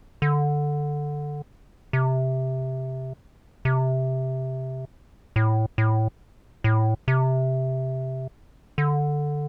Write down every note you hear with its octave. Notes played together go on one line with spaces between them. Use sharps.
D3
C3
C3
A2
A2
A2
C3
D3